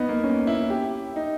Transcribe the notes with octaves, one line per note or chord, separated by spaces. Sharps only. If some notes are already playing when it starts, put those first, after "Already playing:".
Already playing: B3 D#4
A#3
C#4
E4
G4
D#4